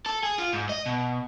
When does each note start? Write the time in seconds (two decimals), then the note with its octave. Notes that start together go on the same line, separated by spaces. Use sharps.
0.06 A4
0.23 G#4
0.38 F4
0.53 G#2
0.69 D#5
0.86 B2